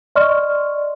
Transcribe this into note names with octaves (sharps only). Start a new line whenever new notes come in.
D5 D#5 C6 C#6 F6